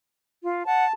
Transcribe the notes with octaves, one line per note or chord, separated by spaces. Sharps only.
F4
F#5 A5